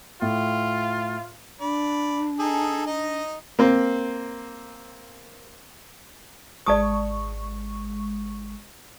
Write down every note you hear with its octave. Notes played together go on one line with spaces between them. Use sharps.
A2 F4
D4 D5 B5
D#4 G#4 A4
D#4 D#5
A#3 C4
G#1 G#3 D5 A5 C#6 D#6